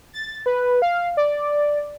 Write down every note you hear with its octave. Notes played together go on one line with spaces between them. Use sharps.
A6
B4
F5
D5